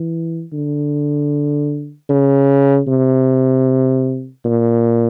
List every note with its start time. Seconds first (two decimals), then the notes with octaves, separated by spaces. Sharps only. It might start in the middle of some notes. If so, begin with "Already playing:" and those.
Already playing: E3
0.53 D3
2.10 C#3
2.88 C3
4.45 A#2